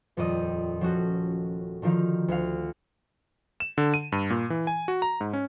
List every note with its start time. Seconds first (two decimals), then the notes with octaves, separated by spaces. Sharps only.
0.17 D#1 F2 D5 D#5 D#6
0.81 F3 C#4 F#4 A4
1.82 D3 D#3 F3 D#4 F5
2.28 D2 F5
3.60 E7
3.78 D3
3.94 D#7
4.12 G2
4.30 A#2
4.50 E3
4.67 G#5
4.88 F#4
5.02 A#5
5.21 G#2
5.33 C#4